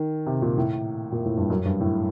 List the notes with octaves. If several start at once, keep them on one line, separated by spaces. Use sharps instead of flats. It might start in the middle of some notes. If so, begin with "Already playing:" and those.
Already playing: D#3
C3
A#2
A2
A#2
A2
G2
F#2
G2
A2